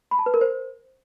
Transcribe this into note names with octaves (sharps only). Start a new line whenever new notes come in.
B5
A5
B4
A#4
C5